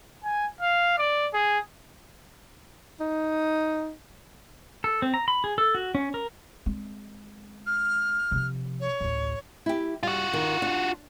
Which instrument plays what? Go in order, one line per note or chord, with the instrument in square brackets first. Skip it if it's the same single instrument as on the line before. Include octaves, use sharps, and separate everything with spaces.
[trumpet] G#5
F5
D5
G#4
[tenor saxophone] D#4
[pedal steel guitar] A4
C4
A#5
B5
G#4
A4
F#4
C#4
A#4
[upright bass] G#3 C4
[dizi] F6
[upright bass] C3 F3
[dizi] C#5
[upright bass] A1 D2
[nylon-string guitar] E4 G4
[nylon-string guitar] G3 [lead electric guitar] F4 F#4
[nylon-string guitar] D#3
D4